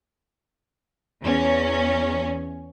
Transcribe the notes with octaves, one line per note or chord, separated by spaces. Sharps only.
E2 C#4